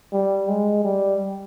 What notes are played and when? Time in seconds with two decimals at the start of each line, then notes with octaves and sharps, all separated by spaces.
0.12 G3
0.48 G#3
0.84 G3